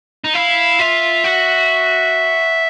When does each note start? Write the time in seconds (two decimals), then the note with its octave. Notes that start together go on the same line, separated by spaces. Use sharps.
0.24 D#4
0.34 E4 F5
0.79 F4 E5
1.24 F#4